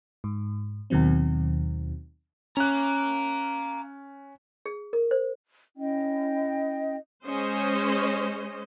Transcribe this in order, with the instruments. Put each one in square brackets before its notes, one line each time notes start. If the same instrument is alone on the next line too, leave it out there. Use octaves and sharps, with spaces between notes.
[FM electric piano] G#2
D#2 B2 D#3 F#3 C4
[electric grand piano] C#4 F#6 [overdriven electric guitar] F5 A#5
[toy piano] G#4
A#4
C5
[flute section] C#4 E4 D#5 G5
[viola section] G#3 C#4 C5 D#5